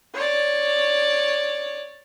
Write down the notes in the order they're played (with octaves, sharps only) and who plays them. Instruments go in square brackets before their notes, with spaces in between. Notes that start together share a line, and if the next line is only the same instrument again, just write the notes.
[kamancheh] C#5 D5